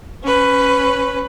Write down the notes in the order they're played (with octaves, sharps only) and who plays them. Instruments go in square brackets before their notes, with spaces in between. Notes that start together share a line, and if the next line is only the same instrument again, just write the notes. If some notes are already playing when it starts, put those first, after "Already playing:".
[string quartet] C#4 B4